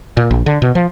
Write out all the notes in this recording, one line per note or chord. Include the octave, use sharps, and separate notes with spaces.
A#2
A#1
D3
B2
F3